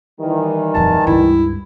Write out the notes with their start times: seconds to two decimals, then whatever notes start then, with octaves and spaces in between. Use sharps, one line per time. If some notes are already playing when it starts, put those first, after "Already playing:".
0.20 D#3 E3 G3
0.75 D#1 F2 A5
1.07 C#2 G2 E4